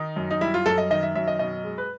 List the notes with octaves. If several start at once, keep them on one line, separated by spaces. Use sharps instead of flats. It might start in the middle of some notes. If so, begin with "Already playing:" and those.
Already playing: D#3 D#4
F#2
D#4
G3 E4
F4
F#2 A4
D#5
D#3 D#5
E5
F#2 E5
D#5
B2 D#5
G#3
B4